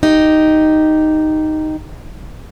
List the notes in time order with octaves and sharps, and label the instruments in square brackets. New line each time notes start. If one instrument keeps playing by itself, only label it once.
[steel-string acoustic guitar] D#4 G4